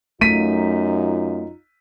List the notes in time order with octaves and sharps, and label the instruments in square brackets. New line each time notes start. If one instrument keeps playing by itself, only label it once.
[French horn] F#2 [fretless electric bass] A3 [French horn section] D#4 F4 [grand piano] B6 D#7